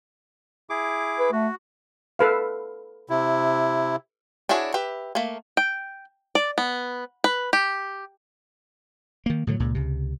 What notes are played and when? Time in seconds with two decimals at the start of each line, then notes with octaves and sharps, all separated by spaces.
0.70 E4 G#4 D6
1.19 B4
1.32 A3 F#4
2.19 A4 B4 F5
3.10 C3 E4
4.49 D4 E4 F#4 G#4 C#5
4.74 G4 B4 E5
5.15 A3 A#3
5.57 G5
6.35 D5
6.58 B3
7.24 B4
7.53 G4
9.26 D#3 A#3
9.47 A2 D3 D#3 F#3
9.60 C#2 A#2 C#3
9.75 C#2 C3